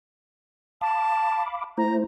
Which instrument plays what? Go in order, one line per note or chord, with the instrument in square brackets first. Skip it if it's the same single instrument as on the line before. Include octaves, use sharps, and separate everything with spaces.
[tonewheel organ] F5 B5 D6 [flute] A5
[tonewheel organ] A3 E4 C5 [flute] A#5